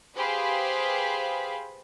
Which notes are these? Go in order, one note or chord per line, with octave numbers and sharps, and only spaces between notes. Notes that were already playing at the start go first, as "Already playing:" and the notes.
G4 G#4 B4 C5 F5 B5